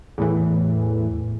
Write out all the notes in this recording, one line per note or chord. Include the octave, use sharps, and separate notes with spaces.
E2 A2 E3